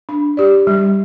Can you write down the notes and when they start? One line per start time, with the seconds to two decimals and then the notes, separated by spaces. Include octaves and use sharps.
0.09 D4
0.37 G4 D5
0.67 G3